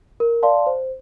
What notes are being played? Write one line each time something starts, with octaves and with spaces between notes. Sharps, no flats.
A#4
D5 F5 A5 C6
C5